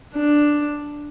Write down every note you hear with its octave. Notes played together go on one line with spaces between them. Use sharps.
D4